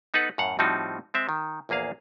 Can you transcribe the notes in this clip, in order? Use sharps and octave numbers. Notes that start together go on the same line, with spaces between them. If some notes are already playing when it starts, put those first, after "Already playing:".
B3 D#4 A4 B4 F#5
F#2 A2 F5 F#5
A2 F3 G3 C4 D#4 F#4
G#3 C4 E5
D#3
A#1 E2 A#3 G#4 F5